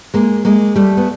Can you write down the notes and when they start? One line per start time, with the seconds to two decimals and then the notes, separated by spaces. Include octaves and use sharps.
0.14 G#3 A#3
0.45 G#3 A#3
0.76 G3 A3
0.97 B3